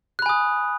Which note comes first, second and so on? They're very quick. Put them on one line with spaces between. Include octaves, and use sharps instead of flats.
F#6 B5 G#5 D#6